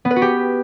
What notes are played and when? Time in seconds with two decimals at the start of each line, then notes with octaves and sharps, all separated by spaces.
0.05 B3
0.11 B4
0.16 F#4
0.22 G4